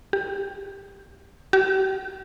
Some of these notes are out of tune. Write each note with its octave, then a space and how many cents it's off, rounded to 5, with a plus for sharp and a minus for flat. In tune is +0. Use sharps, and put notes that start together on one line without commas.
G4 +10
G4 -45